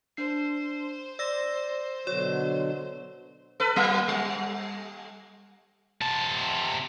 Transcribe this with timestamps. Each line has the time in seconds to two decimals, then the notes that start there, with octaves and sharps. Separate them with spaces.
0.17 D4 C5 C7
1.19 D5 E6 A#6
2.07 B2 D3 F#3 F#4 C#5
3.60 A4 B4
3.76 F#3 A#3
4.08 G3
6.01 C3 A5